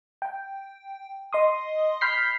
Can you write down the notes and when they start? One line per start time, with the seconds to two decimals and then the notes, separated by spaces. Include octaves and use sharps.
0.22 G5
1.33 D#5 C6 D#6
2.01 B5 F6 G6 B6 C7